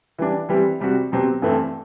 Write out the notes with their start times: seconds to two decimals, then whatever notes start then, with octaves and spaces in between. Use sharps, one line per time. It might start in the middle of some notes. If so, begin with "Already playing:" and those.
0.18 E3 G3 D4
0.49 E3 G3 C4 G4
0.80 C3 G3 C4 F#4
1.12 B2 F#3 C4 G4
1.42 G2 E3 A3 C4